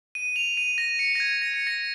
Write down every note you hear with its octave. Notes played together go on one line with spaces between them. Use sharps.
D#7
F7
D#7
A#6
C#7
A#6
G#6
A#6
C#7
A#6